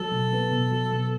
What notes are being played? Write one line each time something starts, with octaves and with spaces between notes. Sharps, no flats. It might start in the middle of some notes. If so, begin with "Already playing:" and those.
Already playing: F#3 A4
B2
B3
B2
F#3
B2